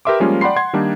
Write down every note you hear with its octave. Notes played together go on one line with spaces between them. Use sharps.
G4 A#4 B4 E5 C6 D6
F3 G3 G#3 A#3 C#4 F4
D5 F#5 G5 B5 C6 C7
F#5 C6 G#6
D#3 G3 A#3 D4 D#4